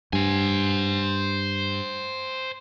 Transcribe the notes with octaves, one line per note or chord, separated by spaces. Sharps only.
G2 C5 G#5